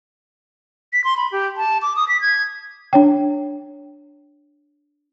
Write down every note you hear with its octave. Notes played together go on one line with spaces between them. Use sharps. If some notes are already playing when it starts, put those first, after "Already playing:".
B6
C6
B5
G4
A5
D6
D#6
B6
G#6
D4 C#5 G5